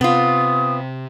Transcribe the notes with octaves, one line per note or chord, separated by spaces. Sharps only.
C3 B3 F4 D#6